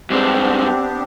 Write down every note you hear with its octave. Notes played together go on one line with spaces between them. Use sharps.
G2 G#3 B3 C4 D4 G4